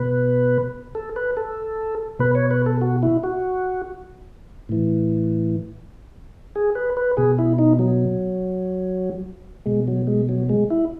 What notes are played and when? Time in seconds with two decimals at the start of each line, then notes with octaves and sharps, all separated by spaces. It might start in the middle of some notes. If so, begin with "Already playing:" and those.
Already playing: B2 B4
0.95 A4
1.16 B4
1.37 A4
2.19 B2 B4
2.35 C#5
2.51 B4
2.66 A4
2.81 F#4
3.03 E4
3.23 F#4
4.69 A2 E3
6.56 G#4
6.75 B4
6.97 B4
7.17 B2 G#4
7.38 E4
7.59 D#4
7.79 F#3
9.66 B2 G#3
9.88 F#3
10.07 G#3
10.29 F#3
10.49 G#3
10.70 E4